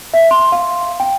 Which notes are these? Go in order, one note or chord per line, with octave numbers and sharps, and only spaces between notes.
E5
C6
F5
G5